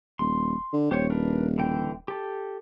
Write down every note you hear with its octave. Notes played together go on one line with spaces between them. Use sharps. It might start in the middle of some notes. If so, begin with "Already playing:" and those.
D#1 C6
D3
D#1 G4 C5 C#5
D4 A#4 B4
D3 E3 G5
G4 A4